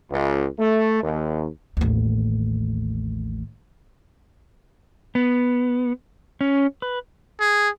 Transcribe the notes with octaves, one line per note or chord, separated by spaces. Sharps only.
C#2
A3
D#2
A1 D#2
B3
C#4
B4
G#4